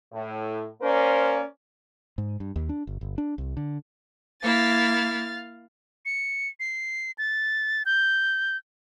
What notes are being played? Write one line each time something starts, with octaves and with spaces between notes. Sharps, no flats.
A2
A#3 C#4 A#4 C5 D5
G#2
G2
D#2
D4
G1
G1
D4
C2
D3
A#3 E4 F5 A6
C#7
C7
A6
G6